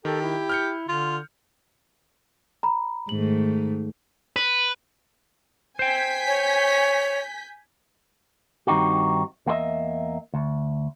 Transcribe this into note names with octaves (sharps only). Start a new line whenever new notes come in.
D#3 G4 A4
E4
F6 G6 C#7
D3 F4
A#5 B5
G#2 D#3 A3 F#7
B4
C5 G5 G#5 G6 B6
C#5
G2 D#3 C4 D#4 F#4 G4
E2 A#3 C4 E4 D#5 E5
D2